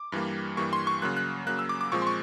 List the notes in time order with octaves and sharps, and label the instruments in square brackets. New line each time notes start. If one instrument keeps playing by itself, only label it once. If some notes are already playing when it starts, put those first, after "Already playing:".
Already playing: [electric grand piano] D6
G2 E3 G3 A#3
G2 E3 G3 A#3 C#6
C6
C#6
C#3 F#3 A#3 F#6
F#6
C#3 F#3 A#3 F#6
E6
D6
D6
A#2 F3 G#3 C4 C#6
C6
C#6